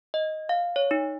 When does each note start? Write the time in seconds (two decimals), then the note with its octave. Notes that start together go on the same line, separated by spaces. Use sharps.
0.14 D#5
0.49 F5
0.76 C#5
0.91 D#4